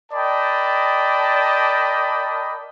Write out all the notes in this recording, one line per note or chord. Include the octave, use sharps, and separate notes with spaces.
A#4 D5 D#5 G5 A5 B5